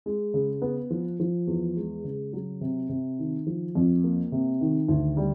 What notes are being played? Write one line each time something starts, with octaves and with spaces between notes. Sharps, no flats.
G#3
C#3
B3
F3
F3
E2
G#3
C#3
F#3
C3
C3
D#3
F3
F2
A#3
C3
D#3
D2
G3